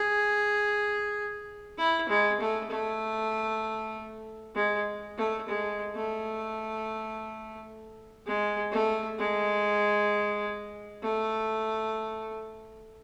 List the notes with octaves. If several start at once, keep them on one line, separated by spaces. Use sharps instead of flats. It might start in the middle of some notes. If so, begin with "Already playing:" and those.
Already playing: G#4
E4
G#3
A3
A3
G#3
A3
G#3
A3
G#3
A3
G#3
A3